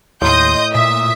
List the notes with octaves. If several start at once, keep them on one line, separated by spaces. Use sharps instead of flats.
D#2 A2 D#5 F5 C6 D#6 G6
A#2 E5 D#6